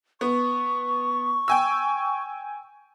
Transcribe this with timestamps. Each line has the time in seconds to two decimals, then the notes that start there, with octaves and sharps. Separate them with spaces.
0.21 B3 C#6
1.48 G5 G#5 E6